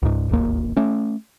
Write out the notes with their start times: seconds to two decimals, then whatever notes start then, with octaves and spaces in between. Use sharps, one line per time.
0.02 C#2 G#2
0.29 D1 G#1 D#2 A#3
0.77 A3 C#4